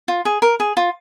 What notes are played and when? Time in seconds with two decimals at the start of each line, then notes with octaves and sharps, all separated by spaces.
0.08 F4
0.25 G#4
0.42 A#4
0.60 G#4
0.77 F4